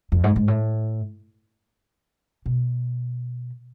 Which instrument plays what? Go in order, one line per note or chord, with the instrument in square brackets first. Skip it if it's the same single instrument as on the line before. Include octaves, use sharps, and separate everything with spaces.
[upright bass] F2
G#2
G#2
A2
B2